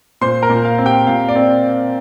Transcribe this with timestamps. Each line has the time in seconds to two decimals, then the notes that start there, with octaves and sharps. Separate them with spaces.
0.21 A#2 C5 C6
0.42 A#4 A#5
0.50 A#2
0.65 F5
0.78 C4
0.86 G4 G5
1.07 A#2 F5
1.28 D5
1.36 C4